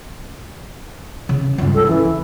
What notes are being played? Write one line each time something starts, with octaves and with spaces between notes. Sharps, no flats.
C#3 C#4
C#2 G2
A4
E3 C#4
D2